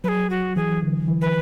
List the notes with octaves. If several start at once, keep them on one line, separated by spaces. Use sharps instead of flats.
F#3 G#4 B4
F#4
E3 G#4
D3
E3
B4